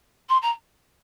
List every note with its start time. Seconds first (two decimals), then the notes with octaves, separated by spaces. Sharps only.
0.29 C6
0.42 A#5